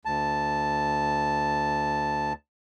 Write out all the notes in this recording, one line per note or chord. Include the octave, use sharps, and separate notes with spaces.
D2 A5